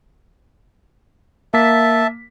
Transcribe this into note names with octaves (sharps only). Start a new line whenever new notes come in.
A#3 E5 A5 B6